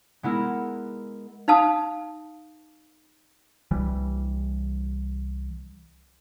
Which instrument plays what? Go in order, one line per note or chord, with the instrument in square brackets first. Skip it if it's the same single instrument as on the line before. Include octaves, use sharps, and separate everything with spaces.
[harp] G#3 B3 E4 A#4
[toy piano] D#4 F5 A5 D#6
[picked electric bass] C2 E3 G3